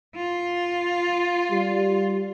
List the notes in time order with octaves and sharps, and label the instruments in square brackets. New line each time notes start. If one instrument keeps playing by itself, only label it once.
[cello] F4
[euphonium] G3